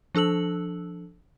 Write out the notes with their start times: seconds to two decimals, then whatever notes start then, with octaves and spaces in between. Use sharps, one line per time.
0.15 F3 D4 A4 E6 F#7